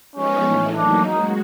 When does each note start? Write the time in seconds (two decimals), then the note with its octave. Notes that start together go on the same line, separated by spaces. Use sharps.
0.14 F3 G#3 B3 C#4 D#4 G4
0.44 A2 E3 A3
0.74 F#3 A#3 D4 D#4
1.03 G#3 C#4 D#4 F#4